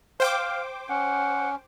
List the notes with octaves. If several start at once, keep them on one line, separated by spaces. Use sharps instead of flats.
C5 F5 G5 D6
C#4 F#5